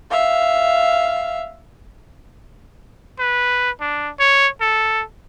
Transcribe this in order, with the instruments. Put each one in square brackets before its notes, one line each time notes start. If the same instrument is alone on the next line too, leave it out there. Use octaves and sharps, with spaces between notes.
[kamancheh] E5 F5
[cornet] B4
D4
C#5
A4